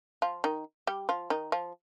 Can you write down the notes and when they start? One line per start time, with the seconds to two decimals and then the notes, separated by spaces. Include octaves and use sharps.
0.22 F3 F4
0.44 D#3 D#4
0.87 G3 G4
1.09 F3 F4
1.30 D#3 D#4
1.52 F3 F4